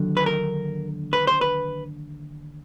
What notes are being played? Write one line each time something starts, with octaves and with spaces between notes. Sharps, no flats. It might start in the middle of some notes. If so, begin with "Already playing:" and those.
Already playing: D#2 D3 F#3
B4
A#4
B4
C5
B4